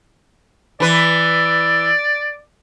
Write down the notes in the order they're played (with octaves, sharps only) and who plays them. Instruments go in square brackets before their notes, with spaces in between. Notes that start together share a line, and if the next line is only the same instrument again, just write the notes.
[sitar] E3 B4 [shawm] D5